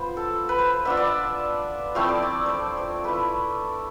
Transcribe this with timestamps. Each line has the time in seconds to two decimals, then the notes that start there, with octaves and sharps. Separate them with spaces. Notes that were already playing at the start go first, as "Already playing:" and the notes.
Already playing: B3 F4 C5
0.17 A4
0.49 B4
0.58 C5
0.85 B3 D4 F4 E5
0.97 D5
1.07 E5
1.95 F3 A3 C4 E4 F5
2.09 D5
2.22 D5
2.46 C5 D5
2.77 C5
3.04 A3 E4 B4